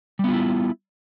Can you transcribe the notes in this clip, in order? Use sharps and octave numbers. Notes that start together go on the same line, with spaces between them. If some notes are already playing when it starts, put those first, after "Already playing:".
G3 B3 E4 F4